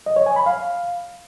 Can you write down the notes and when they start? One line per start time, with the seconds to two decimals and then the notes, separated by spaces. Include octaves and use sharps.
0.06 D#5
0.16 C#5
0.26 G#5
0.36 B5
0.46 F5